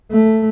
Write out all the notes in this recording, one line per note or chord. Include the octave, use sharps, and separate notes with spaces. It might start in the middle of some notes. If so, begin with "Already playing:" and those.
A3